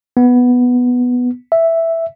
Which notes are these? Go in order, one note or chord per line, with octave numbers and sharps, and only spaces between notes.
B3
E5